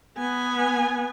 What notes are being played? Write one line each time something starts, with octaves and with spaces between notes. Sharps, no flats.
B3 G#5